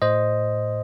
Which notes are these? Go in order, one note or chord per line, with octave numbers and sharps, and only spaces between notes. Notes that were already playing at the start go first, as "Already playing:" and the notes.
A2 C5 D#5